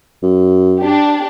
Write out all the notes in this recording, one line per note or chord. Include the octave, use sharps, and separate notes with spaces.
F#2
D4 G4